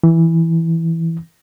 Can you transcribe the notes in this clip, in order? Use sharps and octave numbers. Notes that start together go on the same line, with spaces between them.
E3